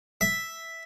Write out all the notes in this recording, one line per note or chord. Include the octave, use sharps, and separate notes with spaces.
E5